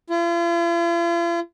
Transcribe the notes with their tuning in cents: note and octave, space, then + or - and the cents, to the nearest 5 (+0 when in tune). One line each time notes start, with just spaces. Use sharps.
F4 -45